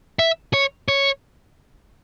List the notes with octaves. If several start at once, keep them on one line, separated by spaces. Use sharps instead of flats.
E5
C#5
C#5